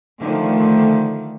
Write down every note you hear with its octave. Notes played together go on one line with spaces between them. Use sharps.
D3 D#3 F3 A3